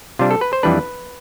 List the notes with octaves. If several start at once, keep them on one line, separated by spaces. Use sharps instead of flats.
C3 G3 D4 F4
A4
B4
C5
F2 E3 G3 D4 B4